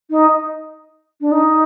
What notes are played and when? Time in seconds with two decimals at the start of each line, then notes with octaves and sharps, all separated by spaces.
0.10 D#4
1.21 D4
1.31 D#4